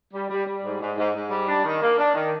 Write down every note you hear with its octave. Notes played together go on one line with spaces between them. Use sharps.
G3
G3
G3
G#2
G#2
G#2
G#2
G3
D4
D#3
A#3
D4
D#3